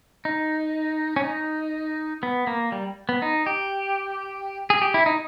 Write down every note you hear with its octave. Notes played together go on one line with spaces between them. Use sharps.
D#4
C#4
D#4
B3
A#3
G3
B3
D#4
G4
G#4
G4
E4
D#4